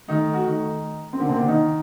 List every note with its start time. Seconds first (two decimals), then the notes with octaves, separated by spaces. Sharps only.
0.08 D#3 A3 D#4
0.33 F#4
0.46 D#3 D#4
1.13 C4
1.19 D3 A#3 D4
1.29 C3 C4
1.38 D3 D4
1.48 D#3 D#4